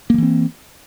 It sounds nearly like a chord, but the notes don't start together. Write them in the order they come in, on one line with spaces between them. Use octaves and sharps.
A#3 F3 E3 C4